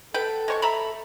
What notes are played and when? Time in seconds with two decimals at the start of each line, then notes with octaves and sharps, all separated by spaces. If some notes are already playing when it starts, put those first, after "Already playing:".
0.14 A4 B4 F#5 G5
0.48 G#3 C#5 C#6
0.62 E5 A#5 B5